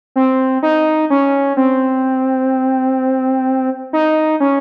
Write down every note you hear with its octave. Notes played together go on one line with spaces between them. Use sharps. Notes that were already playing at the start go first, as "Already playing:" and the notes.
C4
D#4
C#4
C4
D#4
C#4